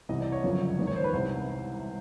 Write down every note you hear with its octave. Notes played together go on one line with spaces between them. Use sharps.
C2 C3 E3 D#5
D5
C#5
G1 F#2 C#3 F3
E1 D#2 D#3 D5
C#5
C5
B4
C2 C3 D#3 C5